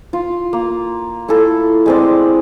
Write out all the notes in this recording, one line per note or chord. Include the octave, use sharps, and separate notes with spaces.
F4
A#3
A3 E4 F4 A4
G#3 C4 D5